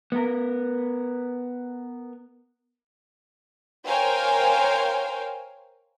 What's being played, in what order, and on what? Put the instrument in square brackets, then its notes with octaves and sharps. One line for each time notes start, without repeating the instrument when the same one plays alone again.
[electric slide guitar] B3 A#4
[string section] A#4 C5 C#5 F5 G5 G#5